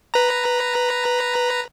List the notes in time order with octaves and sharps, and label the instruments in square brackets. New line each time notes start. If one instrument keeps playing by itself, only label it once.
[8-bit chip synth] B4 A#5